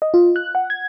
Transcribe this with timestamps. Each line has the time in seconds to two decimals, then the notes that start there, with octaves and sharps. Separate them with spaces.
0.02 D#5
0.14 F4
0.36 F#6
0.55 F#5
0.70 G#6